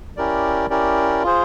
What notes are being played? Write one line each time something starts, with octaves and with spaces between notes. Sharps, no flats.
C#4 E4 G4 A#4 D5
C#4 E4 G4 A#4 D5
F4 G#4 C5